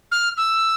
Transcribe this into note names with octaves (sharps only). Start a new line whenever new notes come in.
F6
E6